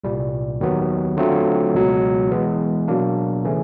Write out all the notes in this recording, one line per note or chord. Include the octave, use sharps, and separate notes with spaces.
C2 A#2 G3
D#2 D#3 F#3 B3
D3 F#3 A3 C4 F4
C#2 B2 F#3
E3 G#3 B3
B2 F#3 A#3 D4
C#3 E3 A3 C#4